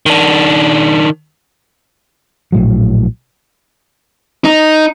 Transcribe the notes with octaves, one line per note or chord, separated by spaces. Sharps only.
D#3 D4
A#1 A2 F#3
D#4